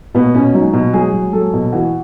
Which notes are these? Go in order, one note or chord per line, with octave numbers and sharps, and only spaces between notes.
B2 B3
B2 C#4
F#3 D#4
B2
F#3 G#4
F#3
F#3 A4
B2
E3 F#4